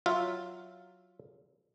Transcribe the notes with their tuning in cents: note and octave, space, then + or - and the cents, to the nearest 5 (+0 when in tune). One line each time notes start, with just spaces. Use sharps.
F#3 +0 F4 +0 E5 +0